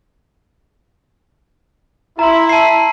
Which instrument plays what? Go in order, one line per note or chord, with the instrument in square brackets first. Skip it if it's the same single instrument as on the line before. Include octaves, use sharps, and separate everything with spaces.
[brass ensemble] E4 [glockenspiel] A#5 C6
[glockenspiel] A5 C7